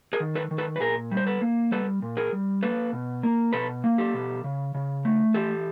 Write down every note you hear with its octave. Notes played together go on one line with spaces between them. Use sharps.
G#4 A#4
D#3
A4 B4
D#3
A4 B4
B4
A#2 G#4 A#4
G3
C5
A4 B4
A#3
G3 A4 B4
A#2
G#4 A#4
G3
A#3 A4 B4
B2
A#3
B2 A4 B4
A#3
G4 A4
B2
C#3
C#3
A3
E3 G4 A4